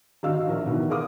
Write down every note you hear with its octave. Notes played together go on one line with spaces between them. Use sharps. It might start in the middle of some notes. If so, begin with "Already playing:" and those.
G#1 D4 F#4 D#5 F5 E6
A#1 A#4 D5 E5
B2 D#3 E3
G#4 A#4 F5 D6 D#6